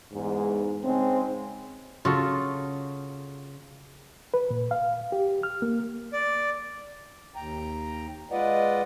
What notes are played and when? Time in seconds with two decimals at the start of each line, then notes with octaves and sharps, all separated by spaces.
0.13 E2 G#2
0.85 G#2 C#3 G#3 C4
2.05 C#3 F4 F#4 A4
4.34 B4
4.50 A#2
4.71 F5
5.12 G4
5.43 F6
5.62 A#3
6.13 D5
7.35 D#2 G5 A#5
8.31 G#3 F4 B4 D5 D#5 F#5